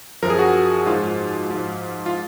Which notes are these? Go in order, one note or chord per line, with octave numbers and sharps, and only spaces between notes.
F#2 F3 A#4
G#4
F#4
G#2 F3 F4
G#2 F3
F4